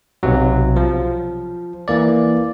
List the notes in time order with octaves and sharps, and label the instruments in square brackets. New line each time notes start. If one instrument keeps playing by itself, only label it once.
[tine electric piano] B1 C3 F#3
F3
E3 A#3 D5